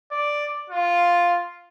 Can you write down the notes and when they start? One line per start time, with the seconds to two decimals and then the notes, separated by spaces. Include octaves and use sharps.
0.11 D5
0.70 F4